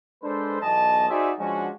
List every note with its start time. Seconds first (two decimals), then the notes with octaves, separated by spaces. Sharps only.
0.23 G#3 D4 A4 B4 C5
0.61 B1 E2 D#5 A5
1.09 D#4 F#4 G#4 C5 D5 E5
1.39 F3 G#3 C#4 D4 F#4